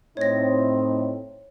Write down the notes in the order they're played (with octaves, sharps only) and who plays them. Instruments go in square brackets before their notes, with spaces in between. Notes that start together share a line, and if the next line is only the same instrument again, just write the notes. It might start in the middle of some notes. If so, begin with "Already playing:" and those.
[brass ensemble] A2 [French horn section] C4 D#4 [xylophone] C#5 A#6